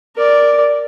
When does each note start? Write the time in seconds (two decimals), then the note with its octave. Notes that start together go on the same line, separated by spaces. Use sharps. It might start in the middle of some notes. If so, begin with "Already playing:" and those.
0.16 A#4 D5